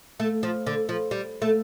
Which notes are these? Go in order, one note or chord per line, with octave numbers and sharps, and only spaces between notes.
A3
F3
D3
F3
G3
A3